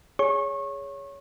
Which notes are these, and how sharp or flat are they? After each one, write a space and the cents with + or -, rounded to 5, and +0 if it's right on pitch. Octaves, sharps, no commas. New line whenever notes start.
G#4 +0 C#5 +15 C#6 -25